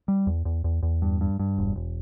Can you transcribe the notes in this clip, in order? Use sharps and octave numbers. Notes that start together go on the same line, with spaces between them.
G3
E2
E2
E2
E2
G2
G2
G2
E1
E1